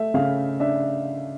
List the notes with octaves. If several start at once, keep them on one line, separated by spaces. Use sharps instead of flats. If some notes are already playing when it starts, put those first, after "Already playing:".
Already playing: A3 E5
C#3 F5
D4 E5